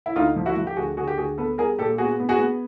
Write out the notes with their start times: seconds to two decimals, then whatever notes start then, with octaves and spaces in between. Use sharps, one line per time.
0.06 E4
0.16 D2 D#4 F4
0.36 F3
0.46 E4 F#4
0.56 F3
0.67 G4
0.76 D2 F#4 G#4
0.97 D3 F#4 G#4
1.07 G4
1.17 D2 F#4 G#4
1.38 B3 A4 B4
1.58 G3 G#4 A#4
1.78 A#2 G4 A4
1.98 B3 F#4 G#4
2.20 B3
2.29 F#4 G#4
2.39 B3